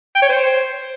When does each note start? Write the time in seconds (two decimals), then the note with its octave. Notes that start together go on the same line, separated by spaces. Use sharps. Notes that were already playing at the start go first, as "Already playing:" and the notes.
0.15 G5
0.22 C#5
0.29 C5